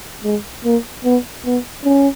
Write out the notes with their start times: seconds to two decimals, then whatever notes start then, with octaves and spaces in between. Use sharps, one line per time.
0.24 G#3
0.64 A#3
1.04 B3
1.45 B3
1.84 C#4